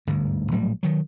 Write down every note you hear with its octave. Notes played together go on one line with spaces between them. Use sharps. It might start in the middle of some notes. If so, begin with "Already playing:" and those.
G1 D2 G#2
A#1 A2 F#3 G3
D#3 F#3